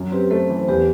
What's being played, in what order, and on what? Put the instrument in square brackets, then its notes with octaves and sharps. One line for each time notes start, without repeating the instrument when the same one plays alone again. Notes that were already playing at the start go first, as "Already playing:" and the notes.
Already playing: [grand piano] F#2 F#3
[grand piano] C4 [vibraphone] G4 B4
[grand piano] A3 [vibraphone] A4 C5
[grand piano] E3
[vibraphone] C5
[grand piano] E2 [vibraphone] G4 B4